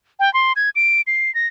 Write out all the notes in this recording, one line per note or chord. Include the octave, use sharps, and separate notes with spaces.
G5
C6
G#6
D7
C7
A#6